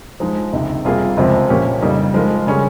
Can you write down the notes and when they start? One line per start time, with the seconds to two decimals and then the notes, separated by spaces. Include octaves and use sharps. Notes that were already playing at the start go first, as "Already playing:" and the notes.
0.20 F3 G#3 D#4
0.53 C#2 C3 D#3
0.85 C3 G3 A#3 F4 G#4
1.17 C#2 C3 F3 G#3 C4
1.49 A#2 F3 A#3 C#4 G4
1.81 F2 C#3 G3 A#3 D#4
2.14 F3 G#3 D#4 A#4
2.46 C#3 G3 C#4 G#4